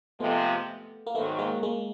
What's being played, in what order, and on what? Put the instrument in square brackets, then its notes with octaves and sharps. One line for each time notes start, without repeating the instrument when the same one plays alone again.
[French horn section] C3 F3 G#3 [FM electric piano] A3 B3
[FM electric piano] A#3
[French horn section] G#2 D#3 F#3 [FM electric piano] A3 B3
[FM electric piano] G#3 A#3
G#3 A#3